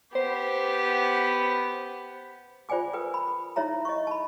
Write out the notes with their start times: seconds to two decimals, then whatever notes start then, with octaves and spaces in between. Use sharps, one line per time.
0.15 B3 G4 C5
2.69 F4 C5 D5 G5 G#5 D6
2.93 A#4 B4 G5 D#6
3.14 B5
3.56 D#4 E4 C#5 E5 A#5
3.85 D#5 C#6
4.07 A5 B5